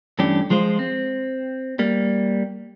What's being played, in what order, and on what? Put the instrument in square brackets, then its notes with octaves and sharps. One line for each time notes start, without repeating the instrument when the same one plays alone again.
[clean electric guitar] G2 E3 A3 C#4 D4 G4
F3 G#3 F4 C5
C4
G3 A#3